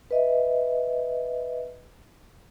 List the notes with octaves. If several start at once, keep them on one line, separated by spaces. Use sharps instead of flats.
B4 D#5 E5